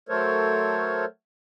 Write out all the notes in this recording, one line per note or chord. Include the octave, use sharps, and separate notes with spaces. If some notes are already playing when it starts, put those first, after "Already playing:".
F#3 A3 A4 A#4 C5 C#5